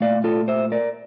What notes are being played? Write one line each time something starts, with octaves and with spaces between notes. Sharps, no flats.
A#2 A3 D5 F5
F4 A4
C5 E5
A#4 D5